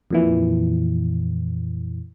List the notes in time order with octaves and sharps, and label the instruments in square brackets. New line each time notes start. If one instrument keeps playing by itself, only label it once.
[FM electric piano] F2 A#2 E3